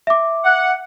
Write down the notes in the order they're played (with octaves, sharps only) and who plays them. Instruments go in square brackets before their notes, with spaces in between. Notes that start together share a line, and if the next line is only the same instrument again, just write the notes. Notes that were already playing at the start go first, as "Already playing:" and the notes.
[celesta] E5 D6
[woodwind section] F#5